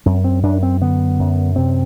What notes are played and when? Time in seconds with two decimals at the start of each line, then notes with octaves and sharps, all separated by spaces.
0.06 F#2 C4
0.24 C4
0.43 F#2 D4
0.63 C4
0.81 D3 B3
1.19 F#2
1.56 C3 C4